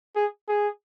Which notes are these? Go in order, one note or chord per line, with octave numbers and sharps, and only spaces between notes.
G#4
G#4